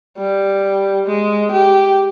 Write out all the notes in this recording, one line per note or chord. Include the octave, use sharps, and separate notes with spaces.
G3
G#3
G4